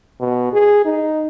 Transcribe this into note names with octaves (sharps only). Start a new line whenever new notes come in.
B2
G#4
D#4